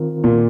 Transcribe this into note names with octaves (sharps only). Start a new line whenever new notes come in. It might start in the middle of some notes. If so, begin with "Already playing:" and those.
Already playing: D#3 C4 F4 A#4
A#2